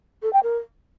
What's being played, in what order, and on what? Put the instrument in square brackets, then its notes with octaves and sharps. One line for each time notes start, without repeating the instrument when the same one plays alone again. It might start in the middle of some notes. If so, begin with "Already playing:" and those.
[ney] A4
G5
A#4